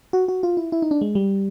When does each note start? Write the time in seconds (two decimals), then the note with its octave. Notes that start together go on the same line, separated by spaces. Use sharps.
0.13 F#4
0.28 F#4
0.43 F4
0.57 E4
0.72 E4
0.82 D#4
0.91 D4
1.01 G#3
1.15 G3